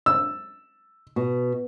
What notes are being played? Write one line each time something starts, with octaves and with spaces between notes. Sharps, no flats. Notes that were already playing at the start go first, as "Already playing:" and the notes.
E6
B2